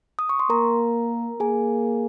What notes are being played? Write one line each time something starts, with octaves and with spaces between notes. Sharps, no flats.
D#6
C#6
C6
A#3 A#4 A#5
A#3 G#4 G#5